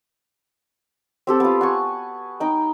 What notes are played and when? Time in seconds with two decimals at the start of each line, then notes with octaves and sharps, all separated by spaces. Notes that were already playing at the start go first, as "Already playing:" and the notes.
1.27 C4 G4 A4
1.40 B3 F4
1.61 F#5 G#5 C#6
2.40 D#4 G5